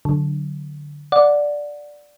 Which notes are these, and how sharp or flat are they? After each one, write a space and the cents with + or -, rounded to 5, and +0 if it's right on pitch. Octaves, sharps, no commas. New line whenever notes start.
D3 +0 F#3 +5
D5 +0 F#5 -15